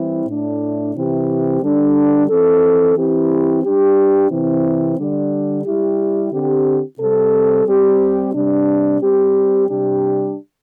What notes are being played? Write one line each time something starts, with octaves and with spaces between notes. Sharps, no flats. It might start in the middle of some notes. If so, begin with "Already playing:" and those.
Already playing: E3 G3 C4 E4
A2 A3 D4
C3 E3 C4 E4 G4
D3 G3 D4 A4
E3 C4 A4
E3 C4 E4 G4
G3 D4 G4
C3 E3 C4 E4
D3 G3 D4
G3 E4 G4
D3 C4 G4
C3 G3 C4 A4
G3 C4 G4
C3 G3 D4
G3 C4 G4
C3 G3 D4 G4